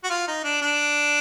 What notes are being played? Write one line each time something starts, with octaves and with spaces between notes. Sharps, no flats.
F#4
F4
D#4
D4
D4